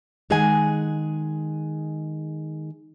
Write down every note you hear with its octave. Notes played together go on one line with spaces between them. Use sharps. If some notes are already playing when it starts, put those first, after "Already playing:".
D#3 G#3 G#4 F#5 G#5